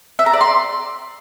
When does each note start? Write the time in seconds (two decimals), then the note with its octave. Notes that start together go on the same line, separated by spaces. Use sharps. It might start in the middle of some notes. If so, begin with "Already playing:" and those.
0.19 E5
0.26 A#5
0.33 D5
0.41 C6